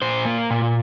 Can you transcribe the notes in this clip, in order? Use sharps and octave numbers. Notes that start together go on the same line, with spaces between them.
A#2 C5
A#3
A#2